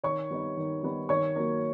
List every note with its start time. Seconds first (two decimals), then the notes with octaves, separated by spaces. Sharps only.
0.03 D#3 C#5 C#6
0.31 G3 B3 D#4
0.57 D#3
0.83 G3 B3 D#4
1.09 D#3 C#5 C#6
1.36 F#3 A#3